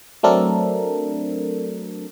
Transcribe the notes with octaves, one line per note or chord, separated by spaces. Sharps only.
F#3 A3 C4 D4 A4 A#4